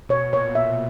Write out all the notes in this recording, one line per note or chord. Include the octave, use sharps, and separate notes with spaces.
B2 C#5
A#2 C#5
E5